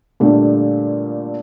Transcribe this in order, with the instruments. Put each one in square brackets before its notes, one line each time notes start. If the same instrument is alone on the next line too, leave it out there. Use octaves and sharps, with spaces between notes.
[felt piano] A#2 D3 G3 A3